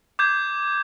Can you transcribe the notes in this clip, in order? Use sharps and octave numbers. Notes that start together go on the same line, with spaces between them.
D6 G6 G#6